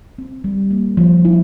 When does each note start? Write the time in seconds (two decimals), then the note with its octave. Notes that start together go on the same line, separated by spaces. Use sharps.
0.18 C4
0.44 G3
0.71 A#3
0.97 F3
1.25 E4